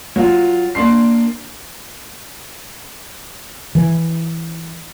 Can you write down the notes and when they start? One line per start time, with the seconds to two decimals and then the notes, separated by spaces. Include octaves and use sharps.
0.16 F#3 F4
0.75 A#3 D4 C6 C7
3.75 E3